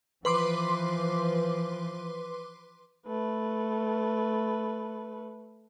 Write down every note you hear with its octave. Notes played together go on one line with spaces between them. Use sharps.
E3 F3 B4 C6 D6
A3 B4